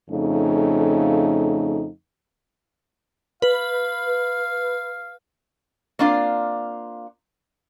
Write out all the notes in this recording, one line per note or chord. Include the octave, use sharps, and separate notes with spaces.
F2 C#3 A3 D#4
B4 F5
A#3 C4 D4 F4 D5 F5